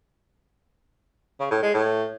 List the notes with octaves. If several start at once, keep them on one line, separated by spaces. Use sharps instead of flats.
C#3
A2
G#3
A2